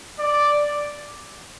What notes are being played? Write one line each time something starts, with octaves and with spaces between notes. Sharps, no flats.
D5